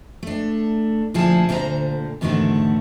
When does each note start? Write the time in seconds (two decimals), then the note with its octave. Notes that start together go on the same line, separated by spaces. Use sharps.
0.23 A3 D4
1.14 D2 A#2 F3 E4 G#4 A5
1.49 D2 A#2 D3 C5 A#5
2.21 E2 G#2 D3 D#3 A3 F#4